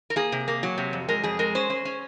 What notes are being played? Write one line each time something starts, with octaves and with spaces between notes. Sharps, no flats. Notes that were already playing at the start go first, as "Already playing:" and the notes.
A#4
A#3 G#4
C3
A#3
F#3
C3
F2
G#3 A#4
F2 G#4
G#3 A#4
C#4 C5
C#4
C#4